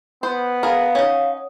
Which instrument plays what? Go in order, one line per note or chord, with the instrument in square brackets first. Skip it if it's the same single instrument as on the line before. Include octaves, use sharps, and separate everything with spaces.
[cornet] B3 [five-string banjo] C5
[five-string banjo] G#4 A#4 [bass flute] F5 [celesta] A#5 B5
[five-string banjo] C#4 D#4 [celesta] C#5 F#5 D#6